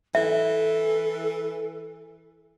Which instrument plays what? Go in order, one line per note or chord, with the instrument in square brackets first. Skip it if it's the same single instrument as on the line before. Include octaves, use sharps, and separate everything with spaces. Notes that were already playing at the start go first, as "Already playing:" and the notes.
[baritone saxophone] E3 [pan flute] A4 [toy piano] E5